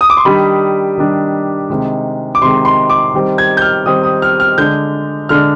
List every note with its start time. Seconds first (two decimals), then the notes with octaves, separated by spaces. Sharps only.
0.01 D#6
0.10 D6
0.17 C6
0.25 D#3 G3 D4 B5
0.98 D#3 G3 D4
1.70 C3 D#3 G#3
2.35 D6
2.41 C3 D#3 G#3 C6
2.65 C6
2.90 D6
3.14 D#3 G3 C4
3.38 G#6
3.57 G6
3.62 F6
3.86 D#3 G3 C4 D#6
4.03 D#6
4.22 F6
4.40 F6
4.58 D3 G#3 D4 G6
5.29 D3 G#3 D4 F6